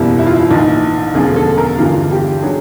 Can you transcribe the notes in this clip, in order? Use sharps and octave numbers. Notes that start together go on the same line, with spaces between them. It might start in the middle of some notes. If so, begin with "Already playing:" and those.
Already playing: F#1 E2 B2 G3 E4
E4
F4
E4
A#1 G#2 E3 D#4
E1 D2 C#3 F3 G#4
A4
A#4
G1 G2 E3 G#3 F4
G4
D3 F#3 G#4